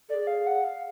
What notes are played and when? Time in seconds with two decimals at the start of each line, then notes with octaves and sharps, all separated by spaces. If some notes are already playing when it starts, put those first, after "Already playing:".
0.09 A4 D5
0.14 G#4
0.21 D5
0.27 F5
0.47 F#5
0.64 F5